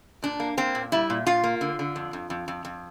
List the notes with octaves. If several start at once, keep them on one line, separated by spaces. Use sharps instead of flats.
A#2 D4
A#3
A#3 C4
A#2
G3 E4
A#2
A#2 F4
A#3
D3
D3
F2
F2
F2
F2
F2